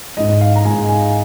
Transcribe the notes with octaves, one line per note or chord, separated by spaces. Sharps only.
G#2 G#3 D#5
D#5
F5
A#5
G#2 G#3 G#5
G#5